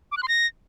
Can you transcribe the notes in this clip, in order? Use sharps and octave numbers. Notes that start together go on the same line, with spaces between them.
D6
F#6
C6
A#6